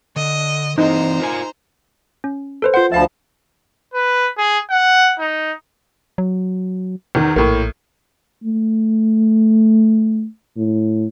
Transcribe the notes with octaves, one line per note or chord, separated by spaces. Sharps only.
D3 D#5
E3 C4 D#4 E4 C5 A#5
F4 A#4 G#5
C#4
A4 B4 C5
F4 C5 F#5
D2 F3 E5 F5 A5 B5
B4
G#4
F#5
D#4
F#3
E2 D#3
A#1 A2 A#3
A3
A2